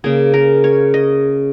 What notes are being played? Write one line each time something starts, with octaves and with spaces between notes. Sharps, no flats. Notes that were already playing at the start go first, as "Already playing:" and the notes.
C#3 A#3 G#4
A#4
C#5
D#5